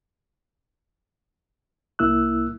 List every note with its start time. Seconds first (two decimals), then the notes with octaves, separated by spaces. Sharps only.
1.99 C2 A#3 E4 E6 F#6